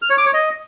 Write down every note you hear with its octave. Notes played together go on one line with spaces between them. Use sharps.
F6
C#5
D6
C#5
D#5